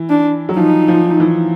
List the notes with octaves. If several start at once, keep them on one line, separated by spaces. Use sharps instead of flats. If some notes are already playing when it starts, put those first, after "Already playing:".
Already playing: E3
D4
F#3
F3 D#4
F3
E3